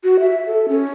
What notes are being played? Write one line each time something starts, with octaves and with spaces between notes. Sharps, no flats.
F#4
E5
A4
C#4